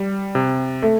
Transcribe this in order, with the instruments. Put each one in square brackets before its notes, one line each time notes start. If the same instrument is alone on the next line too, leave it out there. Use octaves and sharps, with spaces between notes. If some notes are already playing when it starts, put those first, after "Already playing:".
Already playing: [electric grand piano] G3
C3
[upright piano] A3